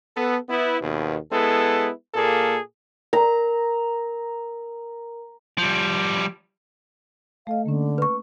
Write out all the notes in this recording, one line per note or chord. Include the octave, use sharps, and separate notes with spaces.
B3 A4
B3 E4
D#2 B2
G#3 B3 E4 A4
A#2 A#3 G#4 A4
A#4 A#5
F3 G3
A3 A4 D#5 F5
D3 A#3 C#4
B4 C#6